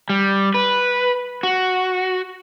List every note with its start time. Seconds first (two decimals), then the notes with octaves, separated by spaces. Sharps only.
0.10 G3
0.54 B4
1.43 F#4